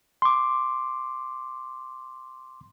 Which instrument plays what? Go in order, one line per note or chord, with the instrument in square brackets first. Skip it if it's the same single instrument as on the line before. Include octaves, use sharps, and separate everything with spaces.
[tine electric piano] C6 D6